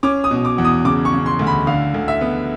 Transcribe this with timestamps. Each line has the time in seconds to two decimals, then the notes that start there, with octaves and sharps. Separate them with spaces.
0.03 C#4 D6
0.24 D#6
0.31 B2
0.45 D6
0.58 E2
0.65 D#6
0.85 C#3 D6
1.05 C#6
1.13 C#3
1.26 C6
1.39 D2
1.47 B5
1.67 D3 F5
1.94 D2
2.08 E5
2.21 B3